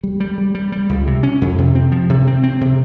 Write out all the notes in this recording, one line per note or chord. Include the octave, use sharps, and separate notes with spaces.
G3
G3
G3
G3
G3
C#2
C3
C#4
F2
C3
C4
F3
C3
C4
C4
C3